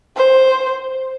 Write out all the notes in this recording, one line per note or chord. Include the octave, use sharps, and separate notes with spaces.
C5